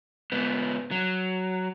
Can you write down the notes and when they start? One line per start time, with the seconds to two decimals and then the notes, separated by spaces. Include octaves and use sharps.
0.32 G#2 B3
0.91 F#3